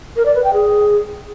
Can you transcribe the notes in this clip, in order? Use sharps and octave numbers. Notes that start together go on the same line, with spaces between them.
A#4
D5
B4
G5
G#4